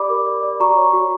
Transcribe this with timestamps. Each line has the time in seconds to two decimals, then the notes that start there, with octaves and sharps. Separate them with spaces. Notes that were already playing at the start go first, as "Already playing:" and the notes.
Already playing: G4 D5 B5 D6
0.10 A#4
0.26 D5
0.43 D5
0.60 F#4 A#5 C#6
0.77 C#5
0.93 F#4